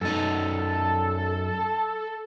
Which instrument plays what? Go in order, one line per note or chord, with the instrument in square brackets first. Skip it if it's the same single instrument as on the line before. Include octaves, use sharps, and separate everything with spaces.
[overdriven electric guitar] F#2 D#4 [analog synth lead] A4